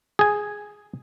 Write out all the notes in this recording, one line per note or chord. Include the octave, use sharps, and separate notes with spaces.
G#4 G#5